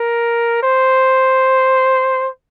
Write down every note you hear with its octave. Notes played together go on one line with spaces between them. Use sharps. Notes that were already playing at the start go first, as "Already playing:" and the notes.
Already playing: A#4
C5